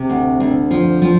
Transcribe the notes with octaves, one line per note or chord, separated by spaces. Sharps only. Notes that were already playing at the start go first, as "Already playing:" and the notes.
Already playing: C3 C4
D2
D2
F3
F3